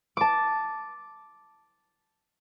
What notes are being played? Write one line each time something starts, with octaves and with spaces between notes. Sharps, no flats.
A5 D6